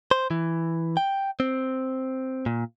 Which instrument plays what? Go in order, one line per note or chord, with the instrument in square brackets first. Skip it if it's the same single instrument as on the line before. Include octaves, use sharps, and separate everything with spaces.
[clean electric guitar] C5
E3
G5
C4
A#2